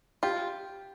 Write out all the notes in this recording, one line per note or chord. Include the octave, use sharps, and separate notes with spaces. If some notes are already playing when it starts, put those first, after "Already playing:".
F4 G4